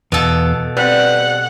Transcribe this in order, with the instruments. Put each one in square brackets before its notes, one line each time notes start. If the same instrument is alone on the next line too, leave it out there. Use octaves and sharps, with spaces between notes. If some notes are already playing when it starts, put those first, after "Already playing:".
[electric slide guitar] E2 B3 F5 [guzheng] B2 A4
[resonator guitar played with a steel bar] G3 C4 [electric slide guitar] B4 [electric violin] F#5